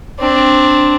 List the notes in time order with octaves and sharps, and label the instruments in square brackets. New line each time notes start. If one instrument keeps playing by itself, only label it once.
[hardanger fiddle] C4 D4